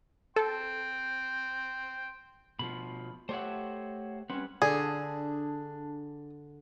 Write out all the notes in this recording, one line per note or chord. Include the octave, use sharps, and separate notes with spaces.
A4 G5 C6
B2 D#3 F3 B5
A3 G4 C5 C#5 E5 F#5
G3 C4 C#4 B4 F#5
D3 D4 G#4 A4